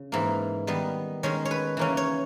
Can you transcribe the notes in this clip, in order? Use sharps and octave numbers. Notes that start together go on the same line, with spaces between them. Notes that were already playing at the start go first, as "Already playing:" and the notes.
Already playing: C#3
G#2 E3 A#3
D#3 G3 B3
D#3 G#3 C#4 C#5
C#5
B4
C#3 E3 A#3 C#4
C#5